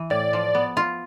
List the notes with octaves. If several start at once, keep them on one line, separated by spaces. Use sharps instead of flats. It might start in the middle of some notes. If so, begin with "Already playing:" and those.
Already playing: E3
A2 D5
F3
B3
F4